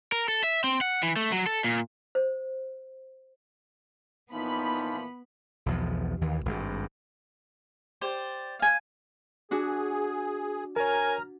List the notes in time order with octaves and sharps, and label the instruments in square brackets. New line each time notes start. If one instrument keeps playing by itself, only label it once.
[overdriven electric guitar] A#4
A4
E5
C4
F#5
E3
A3
F#3
A4
A#2
[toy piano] C5
[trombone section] A#2 E3 F3 [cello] B3 [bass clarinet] D#4 [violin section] B5
[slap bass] B1 E2 F3
D#2 D#3 E3
G#1 G2
[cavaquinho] G4 C5 D5
F5 G#5
[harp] D4 F#4 [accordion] G#4
[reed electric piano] A#4 C#5 [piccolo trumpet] G#5 [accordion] A#5 F6